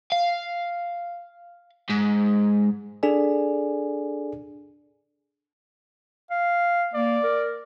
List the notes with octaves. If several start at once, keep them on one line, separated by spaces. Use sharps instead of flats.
F5
G#2
D4 G#4 A4 D5 G#5
F5
A#3 D5
A#4